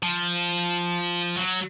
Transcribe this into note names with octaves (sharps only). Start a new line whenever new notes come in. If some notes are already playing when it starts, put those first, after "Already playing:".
F3
F#3